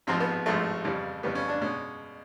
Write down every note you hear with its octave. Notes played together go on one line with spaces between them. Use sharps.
A1 G#2 F3 G#3 C4
B3
A1 G#2 F3 G#3 A3
F2 C#3 E3 G3
F2 C#3 E3 G3 B3
C#4
D4
B2 G#3 C#4